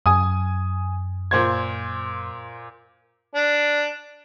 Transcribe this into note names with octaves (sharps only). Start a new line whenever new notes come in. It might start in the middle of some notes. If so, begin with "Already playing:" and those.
F#2 G#5 D#6
A#2 C5 G#6
D4